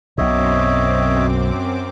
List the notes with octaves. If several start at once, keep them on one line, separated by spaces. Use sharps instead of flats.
B1 F#2 B2 C4 C#5 D#5 E5 D6